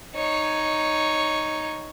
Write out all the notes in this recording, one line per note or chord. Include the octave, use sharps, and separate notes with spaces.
D#4 C#5